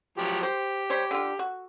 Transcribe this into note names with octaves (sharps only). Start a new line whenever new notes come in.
F3 F#3 G4
G4 C5
G3 C5 C#5
D3 F4
F#4